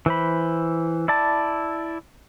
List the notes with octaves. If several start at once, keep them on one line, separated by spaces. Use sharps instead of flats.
E3 C5 B5
E4 D5 A5